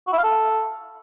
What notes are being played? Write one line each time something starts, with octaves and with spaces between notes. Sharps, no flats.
F#4
E4
F5
A4